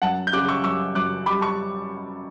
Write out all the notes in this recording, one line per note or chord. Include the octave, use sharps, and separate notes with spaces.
F#2 F#5 A5
G6
C#3 D6 F#6
C#6 E6
F#2 C#6 E6
F#2 D6 F#6
G3 B5 D6
A5 C#6